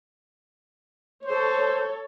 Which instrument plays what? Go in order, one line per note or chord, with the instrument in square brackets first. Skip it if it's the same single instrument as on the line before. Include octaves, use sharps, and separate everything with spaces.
[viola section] A4 C#5 [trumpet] C5